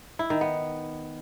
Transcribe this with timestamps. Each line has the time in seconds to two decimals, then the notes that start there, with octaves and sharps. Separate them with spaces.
0.19 E4
0.30 D#3
0.41 B3